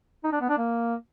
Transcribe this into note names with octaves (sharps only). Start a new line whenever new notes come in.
D#4
D4
B3
D4
A#3